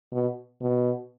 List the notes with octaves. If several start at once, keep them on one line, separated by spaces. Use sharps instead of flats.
B2
B2